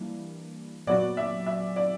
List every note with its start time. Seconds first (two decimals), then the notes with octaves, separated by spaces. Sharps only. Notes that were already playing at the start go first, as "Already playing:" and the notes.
Already playing: E3 G3 A#3 D4
0.87 A#2 F#3 B3 F#4 D5
1.17 E5
1.46 E5
1.76 D5